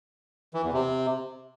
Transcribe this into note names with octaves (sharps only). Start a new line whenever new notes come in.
E3
E2
C3